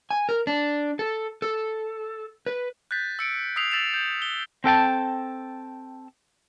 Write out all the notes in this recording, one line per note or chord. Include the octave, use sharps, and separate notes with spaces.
G#5
A#4
D4
A4
A4
B4
F#6 G6 A6 B6
E6 C#7 D7
D#6 E6 B6 C7 F7
E6 A6 B6 E7 F7
G6
G7
C4 A4 G5 A5